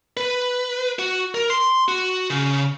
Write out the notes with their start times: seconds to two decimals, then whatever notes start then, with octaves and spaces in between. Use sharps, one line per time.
0.17 B4
0.99 F#4
1.35 A#4
1.50 C6
1.88 F#4
2.30 C#3